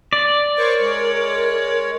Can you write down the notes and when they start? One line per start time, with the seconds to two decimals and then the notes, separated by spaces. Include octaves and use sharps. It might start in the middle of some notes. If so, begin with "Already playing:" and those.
0.13 D5
0.58 A#4 C5 C#5 C#6
0.80 G#3 C#5